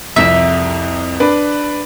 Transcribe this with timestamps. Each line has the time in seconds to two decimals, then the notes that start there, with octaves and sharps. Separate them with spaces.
0.16 C2 F2 E5
1.20 D4 B4